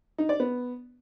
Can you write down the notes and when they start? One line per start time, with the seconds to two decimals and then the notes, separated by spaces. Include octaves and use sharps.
0.18 D#4
0.29 D5
0.40 B3